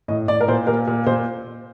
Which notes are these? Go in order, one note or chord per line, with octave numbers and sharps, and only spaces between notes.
A2 D#5
A2 D5
A#4
A#2 C5
A#2 A#4
A#2
A#2 C5